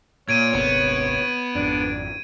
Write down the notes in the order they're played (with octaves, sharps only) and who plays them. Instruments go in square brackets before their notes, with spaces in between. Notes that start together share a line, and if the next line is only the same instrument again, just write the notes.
[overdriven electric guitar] A#2 [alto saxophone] C#5 [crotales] G#6 D7 D#7
[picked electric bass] D#1 G#1 C3 [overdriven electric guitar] B3
[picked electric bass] G#1 F2 [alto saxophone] D4